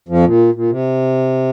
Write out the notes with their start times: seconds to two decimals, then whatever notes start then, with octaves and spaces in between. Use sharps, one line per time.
0.09 F2 F3
0.24 A#2
0.54 A#2
0.70 C3